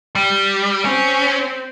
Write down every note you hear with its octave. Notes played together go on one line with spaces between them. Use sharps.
G3
C4 C#4